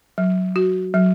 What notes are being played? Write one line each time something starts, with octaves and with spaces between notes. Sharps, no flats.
F#3
F#4
F#3